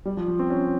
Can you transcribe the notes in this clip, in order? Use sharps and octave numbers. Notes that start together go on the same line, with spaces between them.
G3
F3
F3
C4
C#4